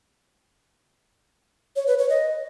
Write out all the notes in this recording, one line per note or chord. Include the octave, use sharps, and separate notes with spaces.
C#5
B4
C#5
D#5